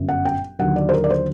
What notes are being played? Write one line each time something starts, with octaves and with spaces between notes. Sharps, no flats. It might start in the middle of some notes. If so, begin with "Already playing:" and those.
Already playing: G1 F#2 F#3
F#5
G5
D#2 D3 F#3 F#5
D5
C5
A#4
D5
C5